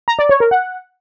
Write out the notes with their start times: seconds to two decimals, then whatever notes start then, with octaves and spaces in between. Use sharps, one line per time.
0.08 A#5
0.19 D5
0.29 C#5
0.40 A#4
0.51 F#5